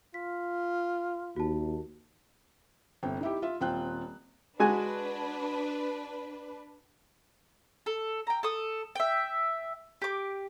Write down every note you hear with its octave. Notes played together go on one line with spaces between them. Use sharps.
F4 B6
D#2 F#4 A5
G1 C3 G5
D#4 E4 G4
F4 E5
D#1 C4 F4 G5 F#6
G#3 D4 F#4 B4 G#5
A4
G5 A#5
A4 D#6
E5 G5
G4 D6